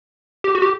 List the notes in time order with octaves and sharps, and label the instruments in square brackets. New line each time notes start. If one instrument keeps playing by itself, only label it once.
[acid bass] G4
F#4
G4